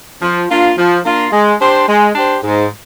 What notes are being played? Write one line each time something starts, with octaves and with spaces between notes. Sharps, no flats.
F3
A#3 D4 F4
F3
A#3 D4 F4
G#3
D4 G4 C5
G#3
D4 G4 C5
G#2